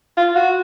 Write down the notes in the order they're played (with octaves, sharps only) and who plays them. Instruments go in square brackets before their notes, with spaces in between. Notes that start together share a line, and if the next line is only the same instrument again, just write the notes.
[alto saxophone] F4
F#4